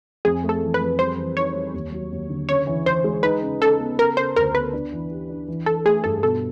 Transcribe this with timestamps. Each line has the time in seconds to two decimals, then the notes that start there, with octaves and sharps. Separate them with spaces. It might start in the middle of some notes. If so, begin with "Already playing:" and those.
0.25 F2 G#4
0.44 A3
0.49 A4
0.61 E3
0.74 B4
0.81 F2
0.99 G3 C5
1.18 E3
1.37 D#4 C#5
1.55 G3
1.74 D#2
1.92 F#3
2.12 D#2
2.29 D3
2.49 C#3 C#5
2.67 E3
2.86 E3 C5
3.04 G#3
3.23 D#4 B4
3.42 C#3
3.61 C#3 A4
3.80 B3
3.98 C#3 A#4
4.17 C#3 C5
4.36 D2 A#4
4.54 B3 B4
4.73 D4
4.92 E3
5.11 G4
5.29 D4
5.48 E3
5.66 E3 A4
5.85 A3 G#4
6.04 G2 A4
6.23 B2 A4